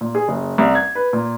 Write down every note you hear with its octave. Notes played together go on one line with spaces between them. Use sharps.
A#2
G#4
F#1
C2
G#6
B4
A#2